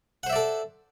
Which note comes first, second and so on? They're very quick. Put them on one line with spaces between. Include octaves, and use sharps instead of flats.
F#5 C5 E5 D5 A4